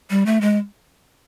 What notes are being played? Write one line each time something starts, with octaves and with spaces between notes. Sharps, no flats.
G3
A3
G#3